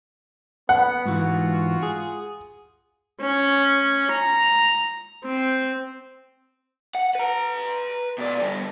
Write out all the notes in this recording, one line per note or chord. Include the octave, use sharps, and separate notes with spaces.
B3 F#5 B5
G#2 E3 F4 F#4
G#4
C#4
A#5
C4
F#5
B4 A#5
B2 D5
D3 G3